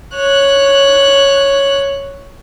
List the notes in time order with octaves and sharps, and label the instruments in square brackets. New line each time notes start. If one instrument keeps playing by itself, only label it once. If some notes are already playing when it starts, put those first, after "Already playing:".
[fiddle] C#5 F#6